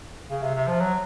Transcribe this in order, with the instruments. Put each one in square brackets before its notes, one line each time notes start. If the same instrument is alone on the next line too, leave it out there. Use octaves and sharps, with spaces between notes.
[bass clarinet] C#3
C3
C3
F3
F#3